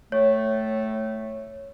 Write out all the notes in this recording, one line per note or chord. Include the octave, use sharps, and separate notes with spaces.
A2 A3 C#5